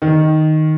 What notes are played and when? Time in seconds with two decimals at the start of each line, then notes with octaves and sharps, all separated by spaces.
0.02 D#3